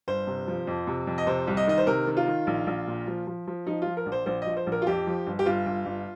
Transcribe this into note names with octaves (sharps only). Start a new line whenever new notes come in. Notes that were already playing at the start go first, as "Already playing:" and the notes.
G1 C5
C3
F3
F2
C3
F2
D#5
C3 C5
C2
D#5
D#3 D#5
C5
C3 A#4
D#3
F4
D#3
A#1
A#1
A#2
F3
F3
F3
F3 D#4
F3 F4
A#4
A#1
C5
A#1 C5
F3 D#5
C5
A#1
A#4
F4
F2 G4
F3
G1
G4
G1 F4
G1
G1